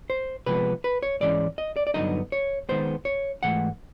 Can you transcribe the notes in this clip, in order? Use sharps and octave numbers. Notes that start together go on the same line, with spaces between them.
C5
C3 F3 G#3 B3 B4
B4
C#5
G#2 E3 G#3 C#4 D5
D#5
D5
D5
G2 D3 F#3 B3 D#4 D#5
C#5
D#3 G#3 B3 C5
C#5
G#2 E3 A3 F#5